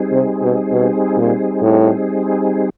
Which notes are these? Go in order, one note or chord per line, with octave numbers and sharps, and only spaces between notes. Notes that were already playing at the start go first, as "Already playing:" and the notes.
Already playing: G3 C4 D#4 G#4
C3
B2
B2
A#2
A2